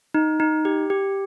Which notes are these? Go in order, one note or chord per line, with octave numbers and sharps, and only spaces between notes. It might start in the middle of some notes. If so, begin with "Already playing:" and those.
D#4
D#4
G4
G4